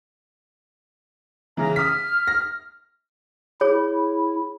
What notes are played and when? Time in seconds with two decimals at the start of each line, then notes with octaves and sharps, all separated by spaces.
1.57 C#3 E3 A#5
1.76 D#6 F6 B6
2.27 A#6
3.61 E4 G#4 C#5